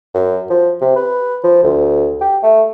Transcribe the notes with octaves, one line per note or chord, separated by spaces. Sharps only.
F#2
F3
C3
B4
F3
D2
G4
A3